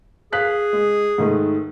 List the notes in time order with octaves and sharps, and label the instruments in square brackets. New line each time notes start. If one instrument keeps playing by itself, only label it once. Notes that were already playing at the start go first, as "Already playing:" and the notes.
[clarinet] G#4 [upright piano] F5 F#6 B6
[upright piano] G#3
G#2 D#3 A3